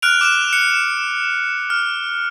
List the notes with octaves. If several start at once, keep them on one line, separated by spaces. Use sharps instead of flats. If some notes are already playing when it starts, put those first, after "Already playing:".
F6 F#6 D7 F7
D6 F6 F#6 E7
F#6 C#7
F6